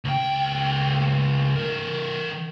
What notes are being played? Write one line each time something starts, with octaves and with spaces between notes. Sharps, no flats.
C#2 G5
E3 A#4